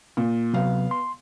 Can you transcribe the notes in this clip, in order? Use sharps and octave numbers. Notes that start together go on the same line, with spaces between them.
A#2
C3 F#3 B3 F5
C6